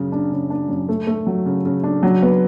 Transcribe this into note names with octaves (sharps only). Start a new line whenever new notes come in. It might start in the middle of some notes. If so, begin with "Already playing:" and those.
Already playing: F#2 C#3
D4
C#3
D4
F#2
A3
A3
F#3
C#3
C#3
D4
F#3
B3